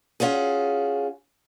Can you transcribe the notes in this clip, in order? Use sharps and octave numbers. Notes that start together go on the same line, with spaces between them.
C#4 F4 F#4 G#4